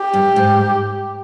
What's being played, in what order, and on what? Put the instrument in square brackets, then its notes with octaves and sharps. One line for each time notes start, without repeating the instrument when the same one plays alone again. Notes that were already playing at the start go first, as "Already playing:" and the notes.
Already playing: [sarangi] G4
[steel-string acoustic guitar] G2
G#2